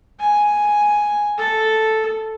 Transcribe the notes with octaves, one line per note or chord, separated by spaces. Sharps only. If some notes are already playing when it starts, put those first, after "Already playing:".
G#5
A4